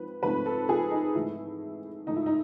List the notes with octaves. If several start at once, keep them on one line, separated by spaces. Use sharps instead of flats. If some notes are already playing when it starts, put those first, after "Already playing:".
Already playing: G#2 F3 C4 B4
G#2 F3 A3 C4 B4
A4
G#4
D#4
G#2 E3 A3 E4
G#2 E3 A3 D#4
E4
D#4